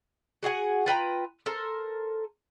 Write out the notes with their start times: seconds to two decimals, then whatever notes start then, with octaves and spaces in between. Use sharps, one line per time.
0.43 F#4 G#4 F#5 G#5
0.86 F4 B4 G5 A#5
1.46 A4 A#4 C5